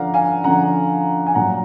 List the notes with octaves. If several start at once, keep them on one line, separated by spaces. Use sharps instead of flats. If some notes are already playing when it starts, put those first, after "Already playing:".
Already playing: D3 F3 D5 F5 F#5 A#5
F5 G#5
D3 F3 F#5 A#5
G#5
A#2 F#3 F#5 A#5